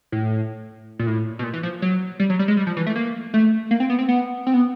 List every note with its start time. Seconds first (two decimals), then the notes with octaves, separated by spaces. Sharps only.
0.12 A2
0.99 A#2
1.07 A2
1.39 B2
1.44 A#2
1.53 E3
1.63 F3
1.82 F#3
2.20 G3
2.30 F#3
2.39 G3
2.48 G#3
2.57 G3
2.67 F3
2.77 E3
2.87 A3
2.96 A#3
3.34 A3
3.71 A#3
3.80 C4
3.90 B3
3.99 C4
4.09 B3
4.47 C4
4.54 B3